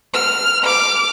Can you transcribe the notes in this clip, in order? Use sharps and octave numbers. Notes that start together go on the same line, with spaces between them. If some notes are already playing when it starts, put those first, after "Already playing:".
F6
D6 F6